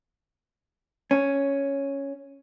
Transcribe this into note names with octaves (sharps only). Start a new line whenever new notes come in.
C#4